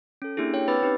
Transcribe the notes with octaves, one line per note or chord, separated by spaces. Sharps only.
C#4 A4
A#3 D4 E4 G4 G#4
C#5 G5
C4 B4 B5 D6 E6 A6
C#4 D#4 G4 B4